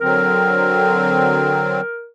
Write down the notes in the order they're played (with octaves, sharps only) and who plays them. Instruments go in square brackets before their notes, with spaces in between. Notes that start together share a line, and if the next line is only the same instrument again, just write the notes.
[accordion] D3 F#3 C4 [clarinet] A#4